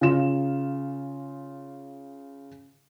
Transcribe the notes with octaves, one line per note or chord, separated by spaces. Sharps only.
C#3 F4 E7